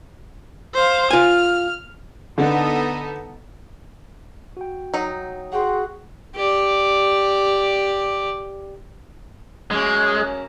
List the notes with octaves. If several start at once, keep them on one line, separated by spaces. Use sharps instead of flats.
C5 F5
F4 G#5 F6
D3 B3 D#4 A4
F#4 G5
F#3 D#4
F#4 G#4 F#5 G5 C6
G4 D5
F#2 G#3 A#3 C#4